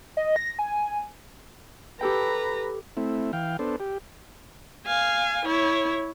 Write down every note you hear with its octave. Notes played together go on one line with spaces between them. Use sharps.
D#5
A#6
G#5
G4 A4 B4 G5 A#5
A3 C4 E4
E3 F5 G5
B3 D4 A4 C5
G4
F5 G#5
E4 C#5